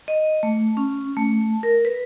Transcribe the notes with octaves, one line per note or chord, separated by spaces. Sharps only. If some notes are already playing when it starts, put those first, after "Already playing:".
D#5
A3
C#4
A3
A#4
B4